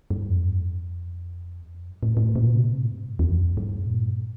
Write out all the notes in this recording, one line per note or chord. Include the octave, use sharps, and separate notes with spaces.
G2
F2
E2
F2
G2
A2
A2
A#2
C3
A2
G2
E2
F2
G2
A#2
G2